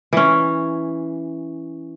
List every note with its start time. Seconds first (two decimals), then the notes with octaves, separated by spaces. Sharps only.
0.13 E3 C#4